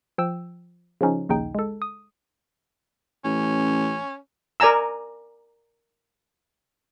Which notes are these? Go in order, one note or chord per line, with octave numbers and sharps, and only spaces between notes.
F3 G5 E6
C#3 F3 C#4 D#4
A#1 D#2 C#3 D#4 G5
G#3 A4
D#6
A1 C#4
A#4 D5 G#5 A#5 E6